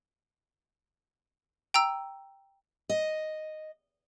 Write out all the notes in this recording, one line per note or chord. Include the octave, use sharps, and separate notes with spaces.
G5 A#5 E6
D#5